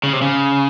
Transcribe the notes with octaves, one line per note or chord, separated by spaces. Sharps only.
C#3
C3
C#3